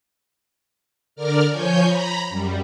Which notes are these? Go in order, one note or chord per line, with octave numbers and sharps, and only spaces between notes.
D3 A#4 D5 F6
F3 C#5 G#5 G6
A#5 B5
F#2 G3